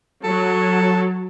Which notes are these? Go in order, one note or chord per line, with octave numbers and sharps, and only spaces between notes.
F#3 A4